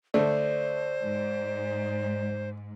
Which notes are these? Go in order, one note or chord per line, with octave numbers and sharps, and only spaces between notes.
D2 A3 C5 D5
G#2